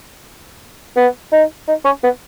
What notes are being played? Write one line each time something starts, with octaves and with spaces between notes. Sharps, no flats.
B3
D#4
D#4
C#4
B3